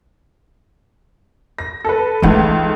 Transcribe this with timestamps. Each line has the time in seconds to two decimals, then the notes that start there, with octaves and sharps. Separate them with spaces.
1.59 A#6
1.85 A4 B4
2.22 C#2 E3 A3 D#4